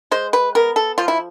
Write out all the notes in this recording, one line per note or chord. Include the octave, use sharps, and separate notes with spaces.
G#3 C5
B4
B3 A#4
A4
F3 F4
E4